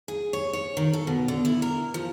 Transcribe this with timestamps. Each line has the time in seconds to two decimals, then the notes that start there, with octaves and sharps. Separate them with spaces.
0.08 G#4
0.33 C#5
0.53 C#5
0.77 D#3
0.93 A4
1.07 B2
1.28 D3
1.45 E4
1.62 A#4
1.94 F3